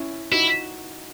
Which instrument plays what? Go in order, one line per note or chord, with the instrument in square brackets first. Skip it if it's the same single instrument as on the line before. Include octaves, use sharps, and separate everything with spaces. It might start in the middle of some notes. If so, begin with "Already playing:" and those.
Already playing: [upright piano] C#4 E4
[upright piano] D#4 F#4 [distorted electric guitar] E4